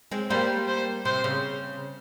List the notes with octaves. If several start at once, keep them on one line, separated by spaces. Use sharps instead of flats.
G#3 C4
G3 A#3 C5
C5
C3 C5
C#3